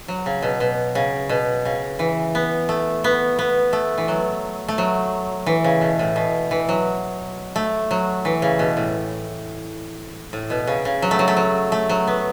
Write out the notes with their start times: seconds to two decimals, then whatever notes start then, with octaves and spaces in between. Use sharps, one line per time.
0.08 F#3
0.26 C#3
0.43 B2
0.60 B2
0.95 C#3
1.29 B2
1.65 C#3
1.99 E3
2.35 B3
2.69 A3
3.04 B3
3.39 B3
3.73 A3
3.98 E3
4.08 F#3
4.68 A3
4.78 F#3
5.46 E3
5.64 C#3
5.81 B2
5.99 A2
6.16 B2
6.51 E3
6.69 F#3
7.56 A3
7.91 F#3
8.25 E3
8.42 C#3
8.59 B2
8.77 A2
10.33 A2
10.50 B2
10.67 C#3
10.85 C#3
11.02 F#3
11.11 A3
11.19 F#3
11.28 A3
11.37 F#3
11.72 A3
11.89 F#3
12.07 B3